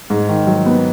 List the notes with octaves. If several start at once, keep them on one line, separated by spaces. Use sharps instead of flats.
G#2
D#3
F#3
B3